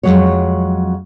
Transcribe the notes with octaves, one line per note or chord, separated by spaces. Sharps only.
F2 E3 F#3 G#3 C#5